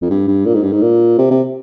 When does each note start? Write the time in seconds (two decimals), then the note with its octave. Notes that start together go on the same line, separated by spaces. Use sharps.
0.02 F2
0.10 G2
0.28 G2
0.46 A#2
0.54 G#2
0.63 G2
0.72 G#2
0.82 A#2
1.18 C3
1.31 C3